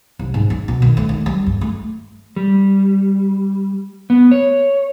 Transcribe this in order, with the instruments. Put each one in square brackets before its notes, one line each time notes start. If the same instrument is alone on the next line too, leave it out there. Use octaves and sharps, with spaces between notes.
[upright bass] C2
G#2
D#4
B2
D#3
A3
D#3
G3
G2
A3
[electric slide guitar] G3
B3
C#5